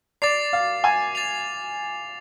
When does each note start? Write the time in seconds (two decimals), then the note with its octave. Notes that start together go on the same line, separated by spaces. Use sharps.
0.22 D5 D6 A6 C7 F7
0.53 F5
0.84 G#5
1.15 D6 A6 C7 F7